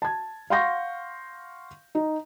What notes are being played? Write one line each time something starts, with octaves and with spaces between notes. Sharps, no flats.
A5 G#6
F5 F#5 C6 C#6 G6 A#6
D#4